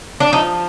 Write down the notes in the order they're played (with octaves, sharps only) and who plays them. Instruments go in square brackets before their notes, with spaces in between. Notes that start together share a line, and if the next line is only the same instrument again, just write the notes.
[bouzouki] D4
[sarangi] F3 [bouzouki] D#4